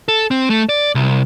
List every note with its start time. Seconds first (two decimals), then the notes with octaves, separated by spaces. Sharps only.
0.08 A4
0.31 C4
0.50 A3
0.69 D5
0.95 C2